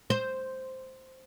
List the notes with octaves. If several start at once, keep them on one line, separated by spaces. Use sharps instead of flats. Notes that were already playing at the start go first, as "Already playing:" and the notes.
C5